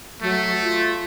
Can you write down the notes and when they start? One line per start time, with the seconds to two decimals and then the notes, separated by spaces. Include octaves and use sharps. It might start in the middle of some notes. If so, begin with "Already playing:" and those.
0.22 F#3 A3
0.63 F4